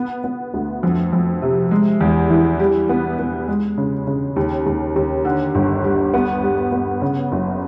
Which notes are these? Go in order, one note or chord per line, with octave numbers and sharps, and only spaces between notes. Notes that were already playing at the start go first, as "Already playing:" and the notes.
Already playing: B3
B3
D2
F2
F2
C3
G#3
E2
E3
G3
B3
B3
G#3
C#3
C#3
D#2
D#2
D#2
D3
G1
G3
B3
G3
B3
C#3
F#1